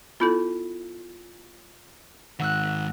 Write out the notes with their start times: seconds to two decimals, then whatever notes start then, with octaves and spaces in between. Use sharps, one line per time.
0.20 B3 E4 F4 A4 B5 G6
2.39 G#2 D#3 F#5 E6 F#6